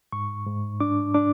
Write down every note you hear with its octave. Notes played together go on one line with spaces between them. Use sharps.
G#2 C#6
G#2
D4 D6
D4 D6